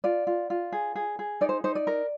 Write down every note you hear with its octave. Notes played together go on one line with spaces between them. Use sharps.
F4 D5
F4
F4
G#4
G#4
G#4
D#4 D5
C5
D#4 C5
D5
A#4